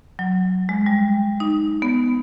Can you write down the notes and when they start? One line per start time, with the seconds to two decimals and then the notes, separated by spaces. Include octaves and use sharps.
0.19 F#3
0.69 G#3
0.86 G3
1.40 D#4
1.82 B3